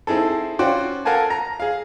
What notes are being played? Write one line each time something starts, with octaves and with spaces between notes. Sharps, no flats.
C4 D#4 E4 G#4 A4
C#4 F4 F#4 C5 D5 G5
A4 A#4 F5 F#5 G#5 A5
A#5
G#4 F5